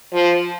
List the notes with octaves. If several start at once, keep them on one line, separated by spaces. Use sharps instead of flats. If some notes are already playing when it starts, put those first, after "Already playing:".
F3